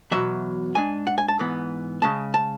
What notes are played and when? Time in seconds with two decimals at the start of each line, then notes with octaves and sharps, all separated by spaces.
0.11 E2 B2 F#3 E5
0.75 G#2 G#3 D4 G#5
1.07 F#5
1.18 G#5
1.28 A5
1.39 G#2 E3 B3
2.02 C#3 G#3 C#4 A5
2.34 A5